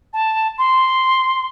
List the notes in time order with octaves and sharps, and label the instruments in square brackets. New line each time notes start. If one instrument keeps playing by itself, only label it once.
[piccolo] A5
C6